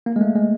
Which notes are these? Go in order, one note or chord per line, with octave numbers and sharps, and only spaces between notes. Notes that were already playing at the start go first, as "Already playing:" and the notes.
A#3
G#3
A3
G#3